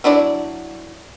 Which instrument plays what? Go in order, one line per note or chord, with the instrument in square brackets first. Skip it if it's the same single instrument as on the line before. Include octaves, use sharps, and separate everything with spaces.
[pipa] F#3 D4 E4 D5